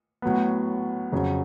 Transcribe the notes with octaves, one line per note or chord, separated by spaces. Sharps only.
A2 F#3 B3
F2 C#3 F#3